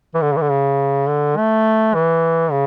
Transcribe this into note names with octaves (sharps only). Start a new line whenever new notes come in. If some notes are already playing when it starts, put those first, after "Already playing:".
E3
D3
C#3
E3
D3
C#3
D3
A3
E3
C#3